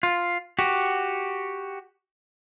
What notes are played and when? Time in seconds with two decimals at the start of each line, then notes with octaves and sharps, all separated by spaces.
0.03 F4
0.59 F#4 G4